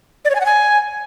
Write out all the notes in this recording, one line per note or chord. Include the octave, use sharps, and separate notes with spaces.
D5
C#5
G#5
F#5
G#5